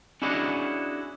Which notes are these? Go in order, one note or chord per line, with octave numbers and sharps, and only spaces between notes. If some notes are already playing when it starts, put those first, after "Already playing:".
C#4 D4 E4 F#4 G#4 D#5